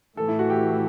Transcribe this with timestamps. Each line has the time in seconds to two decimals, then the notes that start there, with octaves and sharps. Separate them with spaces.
0.17 A2 E3 A3 A4
0.28 E4
0.39 F#4
0.50 G4